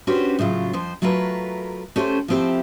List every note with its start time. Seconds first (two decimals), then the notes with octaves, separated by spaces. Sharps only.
0.07 C#4 D4 F#4 G4 B4 C5
0.39 A2 C#3 F#3 F4
0.73 F2 F3 C5
1.02 F#3 A3 F4 A#4 B4
1.96 A3 C#4 G4 A4 C5
2.28 F3 A3 C4 E4 G4